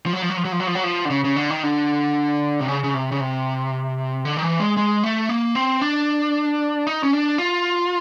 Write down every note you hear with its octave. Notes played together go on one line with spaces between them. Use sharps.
F3
F#3
F3
F#3
F3
F#3
F3
F#3
F3
F#3
F3
D3
C#3
C#3
D3
D#3
D3
C3
C#3
C#3
C3
C#3
C3
D3
D#3
E3
G#3
G#3
A3
A#3
C4
D4
D#4
C#4
D4
F4